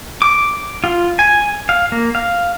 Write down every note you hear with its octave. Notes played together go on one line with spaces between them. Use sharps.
D6
F4
G#5
F5
A#3
F5